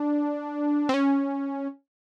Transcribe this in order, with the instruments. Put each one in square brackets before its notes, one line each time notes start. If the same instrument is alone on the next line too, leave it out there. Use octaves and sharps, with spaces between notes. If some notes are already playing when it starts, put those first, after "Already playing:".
Already playing: [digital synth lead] D4
C4
C#4